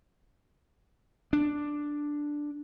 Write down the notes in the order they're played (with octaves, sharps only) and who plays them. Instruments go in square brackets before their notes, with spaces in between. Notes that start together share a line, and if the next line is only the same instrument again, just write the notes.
[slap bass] D4